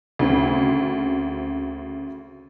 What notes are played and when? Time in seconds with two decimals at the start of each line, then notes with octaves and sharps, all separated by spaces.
0.19 D2 C#3 C4